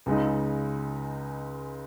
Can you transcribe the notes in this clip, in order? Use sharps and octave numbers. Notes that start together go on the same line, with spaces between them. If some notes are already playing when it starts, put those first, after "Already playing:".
C#2 C#3 G#3 D#4